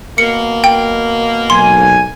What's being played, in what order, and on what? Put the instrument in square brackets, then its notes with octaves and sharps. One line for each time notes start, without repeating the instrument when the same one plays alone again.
[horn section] B2 A#3 [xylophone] C#7
[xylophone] G5
[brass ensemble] B1 G#5 [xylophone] C6